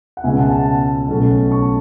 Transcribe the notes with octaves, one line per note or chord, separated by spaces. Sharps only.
F#5
C#2 B2 G#3 C#4 E5 G#5
F#5 A5
F#5 A5
B1 B2 A3 C#4
A5 C#6